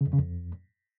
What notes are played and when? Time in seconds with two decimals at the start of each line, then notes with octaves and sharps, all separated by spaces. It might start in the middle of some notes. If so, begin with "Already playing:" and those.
0.01 C#3
0.07 F2
0.13 C#3
0.19 F2